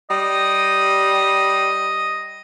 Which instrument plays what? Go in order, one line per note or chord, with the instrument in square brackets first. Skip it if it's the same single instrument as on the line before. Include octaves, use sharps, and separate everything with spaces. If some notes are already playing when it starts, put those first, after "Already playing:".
[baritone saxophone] G3 [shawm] D#5